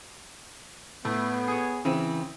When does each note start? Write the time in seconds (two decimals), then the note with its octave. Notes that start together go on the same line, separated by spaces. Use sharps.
1.05 A2 A3 B3
1.48 G#4 C#5
1.85 C#3 E3 C4